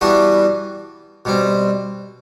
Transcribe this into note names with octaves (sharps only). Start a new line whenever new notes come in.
E3 G3 B3 D4 F#4
B2 G3 C4